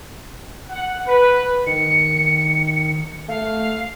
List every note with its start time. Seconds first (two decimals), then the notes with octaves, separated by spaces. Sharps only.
0.70 F#5
1.06 B4
1.67 D#3 C#7
3.28 A3 F5